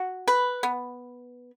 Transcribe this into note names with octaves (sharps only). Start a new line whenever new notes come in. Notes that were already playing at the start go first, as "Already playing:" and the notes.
Already playing: F#4
B4
B3